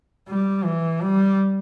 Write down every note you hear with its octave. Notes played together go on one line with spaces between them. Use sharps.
G3
E3
G3